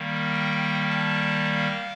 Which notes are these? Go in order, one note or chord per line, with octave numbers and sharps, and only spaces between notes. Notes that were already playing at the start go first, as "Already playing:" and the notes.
Already playing: D#3 G3 A#3
G5
A5
F5